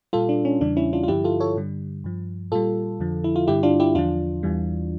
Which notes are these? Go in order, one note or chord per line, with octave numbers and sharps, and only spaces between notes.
A#2 G3 F4 A4
D4
C#4
E2 C#3 E3 G3 D4
C#4 E4
D4 F4
F4
G2 D3 F3 E4 G4
F4 A4
A4 C#5
G2 D3 G3
G2 F3
A#2 G3 F4 A4
F2 D3 F3
E4
F4
G2 D3 G3 E4 G4
D4 F4
E4 G4
E2 D3 F3 D4 F4
E2 E3 G3